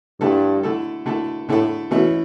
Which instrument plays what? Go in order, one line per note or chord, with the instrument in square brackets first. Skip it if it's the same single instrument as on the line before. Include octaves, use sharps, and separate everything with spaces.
[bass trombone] G2 [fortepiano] D3 A3 E4 A4
[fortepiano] D3 A3 E4 A4
D3 A3 E4 A4
[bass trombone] A2 [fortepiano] D3 A3 E4 A4
[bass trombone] B2 [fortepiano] E3 A3 C#4 E4